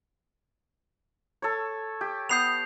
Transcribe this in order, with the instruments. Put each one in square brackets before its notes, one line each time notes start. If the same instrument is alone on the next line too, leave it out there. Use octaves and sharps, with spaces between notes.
[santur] A4 C#5
G4
[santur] B3 D#6 [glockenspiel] G6 C7 F7